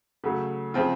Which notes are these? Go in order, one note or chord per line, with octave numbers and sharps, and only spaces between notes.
C#3 F#3 A3
C#3 F3 C4 F4